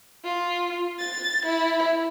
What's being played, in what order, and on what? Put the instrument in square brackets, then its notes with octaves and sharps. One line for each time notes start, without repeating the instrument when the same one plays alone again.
[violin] F4
A6
E4